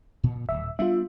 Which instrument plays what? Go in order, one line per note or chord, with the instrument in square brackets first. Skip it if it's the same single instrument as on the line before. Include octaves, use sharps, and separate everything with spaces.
[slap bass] A#2
[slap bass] D1 [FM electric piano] E5
[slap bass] G3 B3 D4 [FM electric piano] F4 E5